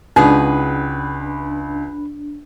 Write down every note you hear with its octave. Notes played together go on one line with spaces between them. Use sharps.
C#2 D4 D#4 F#4 G#4 B4